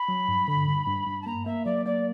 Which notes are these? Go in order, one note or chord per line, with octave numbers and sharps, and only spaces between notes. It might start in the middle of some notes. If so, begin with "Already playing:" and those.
Already playing: B5
F#3
G2
D3
G2
G2
G2
A5
A#3 A#5
A#3 E5
F#3 D5
A#3 D5